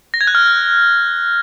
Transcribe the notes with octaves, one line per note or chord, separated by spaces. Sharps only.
A#6
G#6
F#6
F6